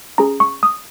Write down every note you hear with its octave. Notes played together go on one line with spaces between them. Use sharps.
C#4 G#4 A#5
C#6
D#6